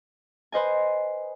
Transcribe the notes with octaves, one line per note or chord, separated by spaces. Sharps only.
B4 C5 D#5 G#5